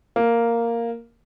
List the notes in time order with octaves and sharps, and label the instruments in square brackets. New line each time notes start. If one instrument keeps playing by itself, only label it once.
[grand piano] A#3